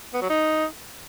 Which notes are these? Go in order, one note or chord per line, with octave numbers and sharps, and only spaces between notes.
B3
F#3
D#4